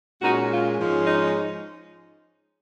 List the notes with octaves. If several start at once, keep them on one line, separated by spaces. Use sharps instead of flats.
A#2 G#3 C#4 D#4 F#4
F4
G#2 F3 G#3 C#4
D#4